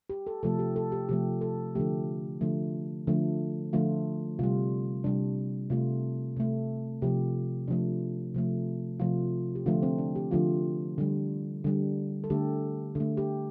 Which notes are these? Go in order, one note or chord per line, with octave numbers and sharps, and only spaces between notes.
G4
A4
C3 F3 A3 A4
G4
A4
G4
C3 F3 A3 G4
A4
D3 F3 A3 G4
D3 F3 A3
D3 F3 A3
D3 F3 A3 F4
C3 G3 F4
C3 G3 D4
C3 A3 F4
C3 A3
C3 F3 A3 G4
C3 F3 A3 D4
C3 F3 A3
C3 F3 A3 F4
G4
D3 F3 A3 F4
C4
D4
G4
D3 F3 A3 F4
D3 G3
D3 G3
A4
D3 A3 G4
D3
A3
G4